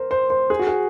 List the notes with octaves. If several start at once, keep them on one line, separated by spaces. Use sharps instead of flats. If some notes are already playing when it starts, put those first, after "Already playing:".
Already playing: A#4 C5
C5
C5
G#4
F#4
G#4